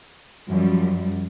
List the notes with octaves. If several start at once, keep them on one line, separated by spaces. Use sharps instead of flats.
F#2 F3 G3